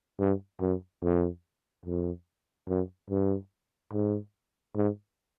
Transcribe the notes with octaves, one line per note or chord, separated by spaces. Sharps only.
G2
F#2
F2
F2
F#2
G2
G#2
G#2